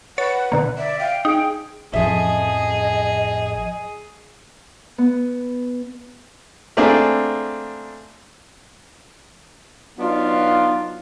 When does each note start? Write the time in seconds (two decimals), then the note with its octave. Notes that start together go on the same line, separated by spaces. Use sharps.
0.18 B4 C#5 F#5 A6
0.52 B2 D3 A#3
0.78 D5 E5
0.99 F5 G5
1.25 D#4 G#4
1.93 A1 F2 F3 G#4 D#5 E5
4.98 B3
6.77 A3 A#3 C4 D4 G#4
9.98 F#3 B3 D4 D#4 F4